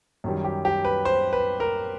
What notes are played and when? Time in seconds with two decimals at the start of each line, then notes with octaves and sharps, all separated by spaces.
0.24 F#2 D#3 G3
0.44 G4
0.65 G4
0.85 B4
1.05 C5
1.33 B4
1.60 A#4